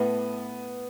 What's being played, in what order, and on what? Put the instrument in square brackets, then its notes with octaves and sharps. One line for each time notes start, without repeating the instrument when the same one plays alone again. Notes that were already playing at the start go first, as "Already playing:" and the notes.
Already playing: [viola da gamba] A2 [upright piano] B3